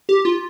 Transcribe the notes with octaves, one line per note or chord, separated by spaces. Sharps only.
G4
F4